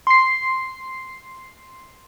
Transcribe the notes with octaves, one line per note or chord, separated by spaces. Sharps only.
C6 C7